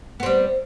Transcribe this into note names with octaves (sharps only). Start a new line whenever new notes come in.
G3 B3 C4